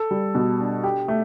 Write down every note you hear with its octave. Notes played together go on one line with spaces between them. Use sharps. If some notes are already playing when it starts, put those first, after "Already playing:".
Already playing: A4
G3
B2
D4
G4
A3